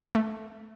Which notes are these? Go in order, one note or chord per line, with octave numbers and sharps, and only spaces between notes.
A3